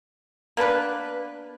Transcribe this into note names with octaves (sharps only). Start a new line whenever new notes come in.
A#3 B3 D4 B4